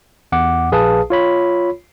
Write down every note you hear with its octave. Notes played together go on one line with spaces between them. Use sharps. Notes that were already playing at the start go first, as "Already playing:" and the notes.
E2 F#5 D6
A#1 G#4 B4 F5 A5 D#6
F4 C#5 B5